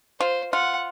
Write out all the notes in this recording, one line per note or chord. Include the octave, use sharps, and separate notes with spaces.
F4 C5
F4 F#5